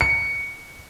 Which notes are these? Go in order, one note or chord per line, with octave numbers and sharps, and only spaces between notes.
C#7